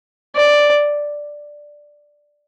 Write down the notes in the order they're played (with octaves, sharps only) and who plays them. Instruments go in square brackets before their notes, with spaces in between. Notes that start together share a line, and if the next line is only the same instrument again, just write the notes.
[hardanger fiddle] D5